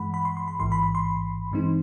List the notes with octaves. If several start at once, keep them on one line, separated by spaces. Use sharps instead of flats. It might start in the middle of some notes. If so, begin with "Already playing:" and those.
Already playing: G2 E3 G#3 F#5 B5
B5
C6
C6
B5
A1 G#2 E3 C6
B5
C6
C6
G2 E3 G#3 C4 D#4